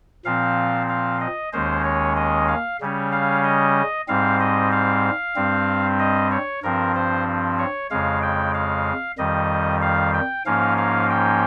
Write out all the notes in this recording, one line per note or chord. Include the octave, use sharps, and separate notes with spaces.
A#2 F3 C4 F5
F5
D#5
D#2 D#3 G#3 C#4 C5
C#5
D#5
F5
C#3 G3 C#4
F5
D#5
G#2 G3 C4 F5
D#5
F5
G2 G3 C4
D#5
C#5
G2 F3 C4 A#4
C5
C#5
F2 C#3 G#3 F5
G5
F5
F2 D#3 G3 D#5
F5
G5
G#2 F3 A#3 C#4 F5
F5
G5